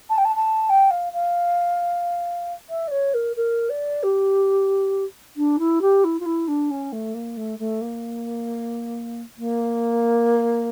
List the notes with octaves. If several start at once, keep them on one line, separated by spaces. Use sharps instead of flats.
A5
G5
A5
A5
G5
F5
F5
E5
D5
C#5
A#4
A#4
D5
G4
D4
E4
G4
E4
F4
E4
D4
C#4
A3
A#3
A3
A3
A#3
A#3